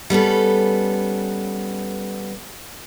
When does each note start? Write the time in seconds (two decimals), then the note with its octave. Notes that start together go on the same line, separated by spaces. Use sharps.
0.10 G3 B3 C#4 A4